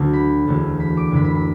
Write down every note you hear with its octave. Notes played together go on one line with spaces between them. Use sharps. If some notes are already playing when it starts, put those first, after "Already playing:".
Already playing: D2 D3 F#3 A3 A5
B5
E1 D2 D3 A3
B5
D6
F#1 F#2 D3 B5
B5
B5